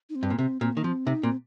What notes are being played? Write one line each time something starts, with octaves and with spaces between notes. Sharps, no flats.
D#4
C4
G2
A#2
C3 C4
A#2 C4
D#3 A#3
F3 C4
C3 D#4
A#2 C4